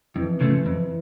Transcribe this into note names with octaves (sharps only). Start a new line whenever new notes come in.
F2 E3
C#3 F3 A3
F2